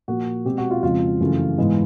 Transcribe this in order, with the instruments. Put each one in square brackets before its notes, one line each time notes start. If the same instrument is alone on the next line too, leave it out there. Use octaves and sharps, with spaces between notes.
[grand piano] A#2 F3 A#3 F#4
B2 G#3 C4 G4
F#4
F4
F2 C#3 F3 G#3 C4 F4
F#2 C#3 E3 A3
G#2 E3 G#3 B3